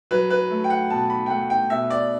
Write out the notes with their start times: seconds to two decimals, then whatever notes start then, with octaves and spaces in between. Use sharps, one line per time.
0.11 F#3 B4
0.30 B4
0.50 A3
0.64 G5
0.70 F#5
0.90 B2 A5
1.10 B5
1.26 G5
1.30 A3 F#5
1.50 G5
1.70 B2 E5
1.90 D5